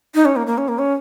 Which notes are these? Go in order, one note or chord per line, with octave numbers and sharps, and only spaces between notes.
D#4
C#4
A#3
A#3
C#4
A#3
C#4